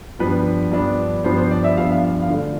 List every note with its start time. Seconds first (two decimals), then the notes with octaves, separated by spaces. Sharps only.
0.19 G2 F3 B3 D4 B4
0.72 G2 F3 B3 D4
1.24 G2 F3 B3 D4 C5
1.38 C5
1.51 D5
1.64 E5
1.77 G2 F3 B3 D4 F5
1.92 F5
2.07 F5
2.22 F5
2.29 D3 F3 A3 D4
2.38 F5